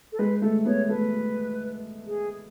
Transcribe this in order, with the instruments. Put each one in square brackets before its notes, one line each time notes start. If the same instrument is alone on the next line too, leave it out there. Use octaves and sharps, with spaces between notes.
[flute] A4
[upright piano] G#3 [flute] B4
[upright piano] A3 [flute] A4
[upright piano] B3 [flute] C#5
[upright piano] A3 [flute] B4
[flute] G#4